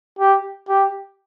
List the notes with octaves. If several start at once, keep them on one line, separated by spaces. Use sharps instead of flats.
G4
G4